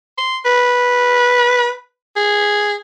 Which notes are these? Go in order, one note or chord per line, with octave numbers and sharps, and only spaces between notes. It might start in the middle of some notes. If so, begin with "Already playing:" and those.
C6
B4
G#4